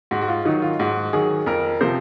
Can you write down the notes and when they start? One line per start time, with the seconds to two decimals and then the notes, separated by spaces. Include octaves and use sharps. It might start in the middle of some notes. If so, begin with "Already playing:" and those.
0.11 G#2 F#4
0.21 F#4
0.28 F4
0.45 D#3 F#3 D#4
0.62 F4
0.79 G#2 F#4
1.13 D#3 F#3 G#4
1.46 F2 A#4
1.81 C3 F3 C5